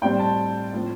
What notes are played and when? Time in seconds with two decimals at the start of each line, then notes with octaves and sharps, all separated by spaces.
0.02 A2 G3 C4 G5
0.19 A5
0.73 A2 F3 C4